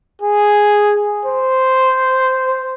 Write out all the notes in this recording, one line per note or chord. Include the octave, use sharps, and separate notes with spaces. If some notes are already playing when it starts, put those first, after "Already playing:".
G#4
C5